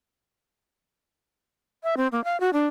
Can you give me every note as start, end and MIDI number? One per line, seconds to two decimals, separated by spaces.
1.83 1.95 76
1.97 2.07 60
2.12 2.23 58
2.24 2.39 77
2.40 2.50 66
2.53 2.66 62